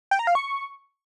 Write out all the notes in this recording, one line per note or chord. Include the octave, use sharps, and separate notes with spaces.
G5
A#5
F5
C#6